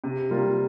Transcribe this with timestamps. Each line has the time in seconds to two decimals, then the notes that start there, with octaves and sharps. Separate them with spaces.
0.04 C3
0.31 G3 A#3 F4